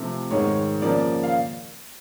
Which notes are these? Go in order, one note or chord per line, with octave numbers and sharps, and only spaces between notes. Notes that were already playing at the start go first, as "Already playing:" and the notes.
Already playing: C3 F3 A3 C4
G#2 D#3 G#3 C#5
C#3 F3 A#3 D5
F5